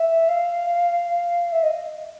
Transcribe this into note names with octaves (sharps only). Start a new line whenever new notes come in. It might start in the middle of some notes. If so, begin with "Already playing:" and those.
Already playing: E5
F5
E5
D#5